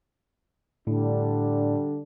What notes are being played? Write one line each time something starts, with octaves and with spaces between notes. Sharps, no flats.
A2 D3 G3 D4